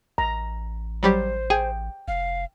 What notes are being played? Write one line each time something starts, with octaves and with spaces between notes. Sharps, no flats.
A1 A#5
F#3 G3 G4 C5
G#4 G5
F1 F5